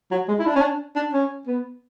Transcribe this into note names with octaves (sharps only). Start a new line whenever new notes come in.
F#3
G#3
E4
D4
C#4
D4
D4
C#4
B3